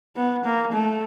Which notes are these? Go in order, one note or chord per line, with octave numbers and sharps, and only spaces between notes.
B3
A#3
A3